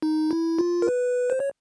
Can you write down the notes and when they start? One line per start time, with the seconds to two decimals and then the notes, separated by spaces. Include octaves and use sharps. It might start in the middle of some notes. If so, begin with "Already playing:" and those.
0.02 D#4
0.31 E4
0.59 F4
0.82 A#4
0.88 B4
1.30 C5
1.40 C#5